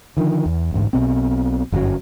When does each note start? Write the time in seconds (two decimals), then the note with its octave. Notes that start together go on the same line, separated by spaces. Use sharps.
0.17 D3 D#3 F3
0.46 E2
0.73 A1 D2 G#2
0.93 B1 B2 C4
1.72 G1 F#2 A2 F#3